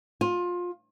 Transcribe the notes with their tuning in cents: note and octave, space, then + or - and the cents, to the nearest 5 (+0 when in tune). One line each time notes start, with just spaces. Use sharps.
F4 +20